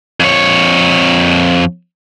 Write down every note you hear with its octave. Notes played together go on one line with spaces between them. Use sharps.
F2 C#5